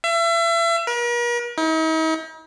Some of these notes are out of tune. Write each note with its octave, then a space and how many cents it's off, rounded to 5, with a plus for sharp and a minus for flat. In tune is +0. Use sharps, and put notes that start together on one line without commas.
E5 +35
A#4 +45
D#4 +45